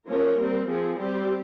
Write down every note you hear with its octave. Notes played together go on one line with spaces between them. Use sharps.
F3 A#3 C#4 A#4
G3 C4
F3 C4 G#4
G3 C4 G4